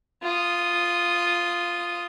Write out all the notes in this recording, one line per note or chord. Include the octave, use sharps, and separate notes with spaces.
F4 D#6